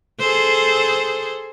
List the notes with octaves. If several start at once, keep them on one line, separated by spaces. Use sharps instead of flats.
G#4 A4 C5